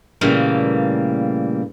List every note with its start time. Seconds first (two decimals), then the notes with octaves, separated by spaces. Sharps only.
0.21 A#2 C#3 E3 G3 A3 A#3